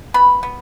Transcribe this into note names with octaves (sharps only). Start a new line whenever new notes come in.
B3 B5
B3